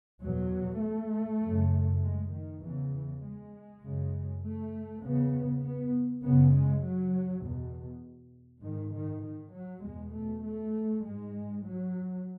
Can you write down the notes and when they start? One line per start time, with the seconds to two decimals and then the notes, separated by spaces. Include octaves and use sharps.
0.22 E2 B2 F#3
0.81 A3
1.42 F#2 C#3
2.02 G#3
2.32 D#3
2.61 E2 C#3 E3
2.92 E3
3.23 G#3
3.83 F#2 C#3
4.42 A3
5.02 E2 C#3 B3
5.63 B3
6.23 F#2 C#3 B3
6.52 G#3
6.83 F#3
7.43 E2 B2
8.62 G#2 D#3
8.93 D#3
9.23 D#3
9.53 F#3
9.84 E2 B2 G#3
10.13 A3
10.43 A3
11.03 G#2 G#3
11.64 F#3